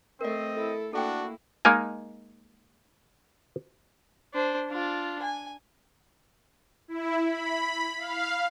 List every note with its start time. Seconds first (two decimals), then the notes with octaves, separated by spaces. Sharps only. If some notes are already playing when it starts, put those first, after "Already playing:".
0.21 A3 C4 A#4 C5 D5 D#5
0.52 E4 A4
0.93 A#3 D4 E4 F#4 A4 G5
1.65 G#3 A#3 D#4 A#4 G#5
4.33 D4 C5
4.68 D4 F4
5.22 G#5
6.88 E4
7.24 B5
7.98 F5